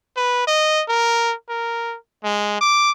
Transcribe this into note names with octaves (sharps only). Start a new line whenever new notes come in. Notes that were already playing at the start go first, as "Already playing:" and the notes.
B4
D#5
A#4
A#4
G#3
D6